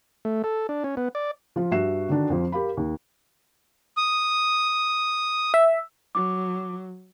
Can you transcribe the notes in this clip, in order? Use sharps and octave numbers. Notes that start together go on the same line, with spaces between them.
A3
A4
D4
C#4
B3
D5
F3 F4
G2 F#4 E5 C7 E7
D3 D#3 D4 F#4
F2 F3
G4 A#4 F5 B5
D#2
D#6
E5
F#3 D6